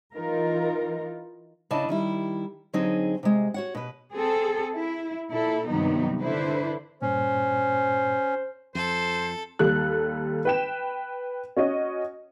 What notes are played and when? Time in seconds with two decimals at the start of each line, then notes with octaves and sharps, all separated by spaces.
0.14 E3 D#4 F4 A#4
1.71 C#3 D4 E4 D#5 A5
1.89 D#3 G3 E4
2.73 D3 F#3 C4 D#4 G#4
3.23 C3 G#3
3.54 F#4 C#5 F#5
3.75 B2 B4
4.12 C4 G#4 A4
4.74 E4
5.30 A#2 E4 A4
5.66 G2 C3 D#3 F#3 B3 D#4
6.21 D3 E4 B4 C5
7.02 G2 A#2 C#4 C5
8.75 F2 A4 C5
9.59 D#2 G3 A4 F#6
10.45 B4 G5 E7
11.57 C#4 F#4 D#5